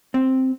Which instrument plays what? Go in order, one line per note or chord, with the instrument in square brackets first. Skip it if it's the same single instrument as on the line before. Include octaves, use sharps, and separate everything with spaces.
[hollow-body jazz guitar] C4